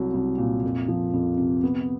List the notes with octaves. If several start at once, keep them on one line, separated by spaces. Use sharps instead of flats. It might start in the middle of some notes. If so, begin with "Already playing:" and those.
Already playing: C2 F#3
C2
A#2
F2
F3
F2
C3
B3